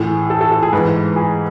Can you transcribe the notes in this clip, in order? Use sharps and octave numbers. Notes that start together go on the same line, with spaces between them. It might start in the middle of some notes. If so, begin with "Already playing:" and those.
Already playing: A2 E3 G#4
A4
A4
A4
G#4
G#2 E3 B4
G#4